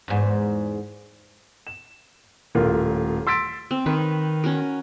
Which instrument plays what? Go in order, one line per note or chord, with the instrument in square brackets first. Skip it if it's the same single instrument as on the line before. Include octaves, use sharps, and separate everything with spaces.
[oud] E2 G#2
[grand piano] E7
D#1 A2 F4 A4 A#4
C6 E6 A6 B6 D7
[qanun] C4
[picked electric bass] D#3 [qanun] B4
[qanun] C#4 F#4 A#4